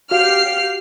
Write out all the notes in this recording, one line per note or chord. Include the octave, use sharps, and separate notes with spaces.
F#4 G4 F5 F6 C7